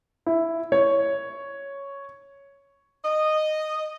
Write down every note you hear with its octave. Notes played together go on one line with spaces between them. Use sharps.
E4
C#5
D#5